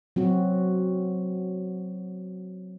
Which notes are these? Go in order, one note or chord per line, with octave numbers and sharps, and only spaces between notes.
F#3 C4 F#4